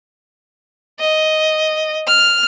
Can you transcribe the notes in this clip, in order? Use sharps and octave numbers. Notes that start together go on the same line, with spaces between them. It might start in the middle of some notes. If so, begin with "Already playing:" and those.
D#5
F6